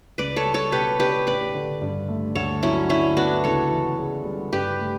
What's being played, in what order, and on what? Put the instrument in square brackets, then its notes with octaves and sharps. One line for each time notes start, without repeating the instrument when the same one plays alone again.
[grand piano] C#2 [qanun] B4 D5
[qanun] A4 C#5
[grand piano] G3
[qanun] A4 C#5
[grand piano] B2 [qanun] G4 B4
[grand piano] D4 [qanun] G4 B4
[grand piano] A1 [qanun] B4 D5
[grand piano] D3
G2
A3
[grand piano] D2 [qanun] A4 C#5
[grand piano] F#3 [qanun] C#4 E4
[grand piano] D3 [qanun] C#4 E4
[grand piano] B3 [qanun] D4 F#4
[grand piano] C#2 [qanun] A4 C#5
[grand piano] E3
C#3
G3
[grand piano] G2 [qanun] G4 B4
[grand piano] A3